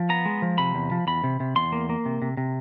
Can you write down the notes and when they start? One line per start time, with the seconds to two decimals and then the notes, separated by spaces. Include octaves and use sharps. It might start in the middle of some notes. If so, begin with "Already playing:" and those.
Already playing: F3
0.09 B3 A#5
0.26 G#3
0.42 F3
0.58 C3 B5
0.75 E2
0.91 F3
1.07 E2 B5
1.24 C3
1.40 C3
1.56 E2 C6
1.72 A#3
1.90 A#3
2.06 C3
2.22 C3
2.37 C3